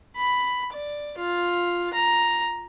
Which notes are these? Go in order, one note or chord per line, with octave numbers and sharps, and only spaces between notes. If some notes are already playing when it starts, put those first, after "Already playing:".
B5
D5
F4
A#5